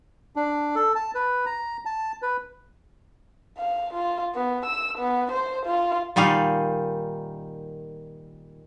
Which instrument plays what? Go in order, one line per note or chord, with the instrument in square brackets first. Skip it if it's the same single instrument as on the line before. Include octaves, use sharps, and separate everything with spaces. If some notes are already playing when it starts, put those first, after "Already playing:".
[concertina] D4
A4
A5
B4
A#5
A5
B4
[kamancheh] F5
F4
B3
E6
B3
C5
F4
[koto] A#2 D#3 G3 D#4 F5